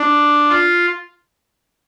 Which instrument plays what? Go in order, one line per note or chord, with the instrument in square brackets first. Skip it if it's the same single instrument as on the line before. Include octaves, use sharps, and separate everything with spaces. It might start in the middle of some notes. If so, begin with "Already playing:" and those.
Already playing: [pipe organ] D4
F4